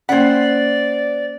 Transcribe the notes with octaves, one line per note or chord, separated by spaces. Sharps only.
A#3 C#4 C5 D5 F#5